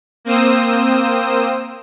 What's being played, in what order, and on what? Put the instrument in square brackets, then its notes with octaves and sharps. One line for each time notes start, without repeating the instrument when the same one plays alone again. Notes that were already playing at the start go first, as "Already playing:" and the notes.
[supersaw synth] A#3 C4 C5 D#6 E6